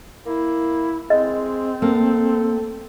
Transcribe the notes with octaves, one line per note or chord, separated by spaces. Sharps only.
A#3 E4
G#3 C4 D#5
A#3 A4